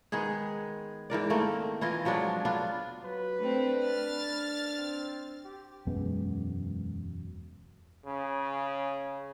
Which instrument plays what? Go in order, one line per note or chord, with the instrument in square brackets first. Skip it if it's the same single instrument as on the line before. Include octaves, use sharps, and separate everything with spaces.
[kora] D#3 G#3 B3 G#4
G#2 E3 A#4 D5
D#3 A3 A#3 C4
E3 E4 F4 D#5
F3 F#3 G#3 D4
B3 D4 F4
[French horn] F#3 [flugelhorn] B4
[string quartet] A3 C4 [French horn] D4
[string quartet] F6 A6
[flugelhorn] C4
G4
[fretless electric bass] E1 F#2 G#3 B3
[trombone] C#3